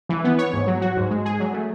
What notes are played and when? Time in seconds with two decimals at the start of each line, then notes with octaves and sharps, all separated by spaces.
0.09 E3
0.24 B3
0.38 C#5
0.53 G#2
0.67 F#3
0.81 F#4
0.97 G#2
1.10 G#3
1.25 G#4
1.40 F#3
1.54 A3